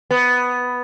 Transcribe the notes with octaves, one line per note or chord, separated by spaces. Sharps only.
B3